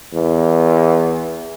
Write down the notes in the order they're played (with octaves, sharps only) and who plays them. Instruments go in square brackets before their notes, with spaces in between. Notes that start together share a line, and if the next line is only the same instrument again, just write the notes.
[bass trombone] E2